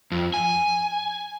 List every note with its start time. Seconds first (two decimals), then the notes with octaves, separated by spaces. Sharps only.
0.11 F2
0.34 G#5